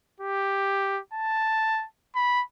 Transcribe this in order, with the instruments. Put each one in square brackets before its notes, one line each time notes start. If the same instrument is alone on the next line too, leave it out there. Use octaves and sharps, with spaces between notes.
[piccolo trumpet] G4
A5
B5